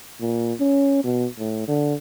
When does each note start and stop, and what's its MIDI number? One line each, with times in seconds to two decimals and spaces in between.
0.21 0.53 46
0.60 1.04 61
1.04 1.27 47
1.38 1.64 45
1.68 1.94 50